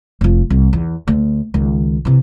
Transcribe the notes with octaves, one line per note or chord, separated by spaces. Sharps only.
F1 F3
C2
E2
D2
C#2 D#3
C3 E3